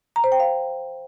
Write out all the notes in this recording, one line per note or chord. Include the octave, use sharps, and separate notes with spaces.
A#5
C5
G5
F5